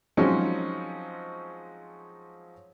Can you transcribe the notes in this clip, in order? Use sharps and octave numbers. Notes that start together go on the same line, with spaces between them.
F3 F#3 G#3 C4 C#4 D#4